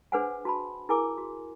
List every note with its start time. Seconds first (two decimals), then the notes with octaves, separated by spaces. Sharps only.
0.12 D4 G#4 B4 C5 F#5 G#5
0.45 F#4 A5 B5
0.89 E4 G#4 A#4 G#5 D6
1.18 F#4